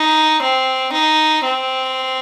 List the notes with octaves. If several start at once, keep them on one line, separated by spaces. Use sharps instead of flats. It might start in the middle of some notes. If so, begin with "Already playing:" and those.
Already playing: D#4
C4
D#4
C4